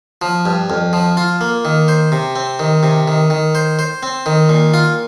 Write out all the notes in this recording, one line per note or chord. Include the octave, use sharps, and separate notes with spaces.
F3
G2
F2
F3
F4
A#3
D#3
C5
C3
C4
D#3
C3
D#3
D#3
C5
C5
C4
D#3
A#2
F4